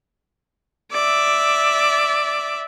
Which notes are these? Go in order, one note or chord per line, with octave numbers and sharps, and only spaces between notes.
D5 E5